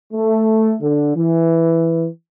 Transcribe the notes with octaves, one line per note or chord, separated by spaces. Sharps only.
A3
D3
E3